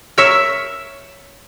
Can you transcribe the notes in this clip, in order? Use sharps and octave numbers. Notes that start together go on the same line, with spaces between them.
A#4 C#5 E5